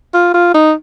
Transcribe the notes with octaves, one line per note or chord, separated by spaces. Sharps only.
F4
F4
D#4